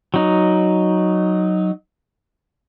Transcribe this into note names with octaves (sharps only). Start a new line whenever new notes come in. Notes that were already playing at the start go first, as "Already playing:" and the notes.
F#3 D#4